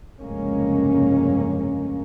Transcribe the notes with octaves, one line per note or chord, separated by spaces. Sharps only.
F1 C#2 G2 G#3 A#3 C#4